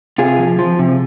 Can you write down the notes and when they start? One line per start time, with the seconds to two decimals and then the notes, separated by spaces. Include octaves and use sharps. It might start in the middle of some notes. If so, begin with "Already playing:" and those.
0.18 C3 F4 G#4
0.39 F3
0.59 F3
0.79 C3